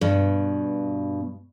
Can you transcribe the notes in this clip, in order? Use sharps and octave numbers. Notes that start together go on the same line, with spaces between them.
G2 B2